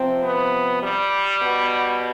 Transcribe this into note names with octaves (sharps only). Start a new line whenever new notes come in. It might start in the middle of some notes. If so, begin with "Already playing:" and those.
Already playing: C3 F3 C4
B3
G3
B2